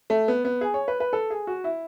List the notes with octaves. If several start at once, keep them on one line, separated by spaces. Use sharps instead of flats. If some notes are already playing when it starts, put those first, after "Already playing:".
A3
B3
B3
G#4
C#5
B4
B4
A4
G#4
F#4
E4